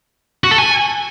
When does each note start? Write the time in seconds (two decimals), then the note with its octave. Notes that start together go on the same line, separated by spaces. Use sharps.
0.44 F#4
0.51 A4
0.58 G#5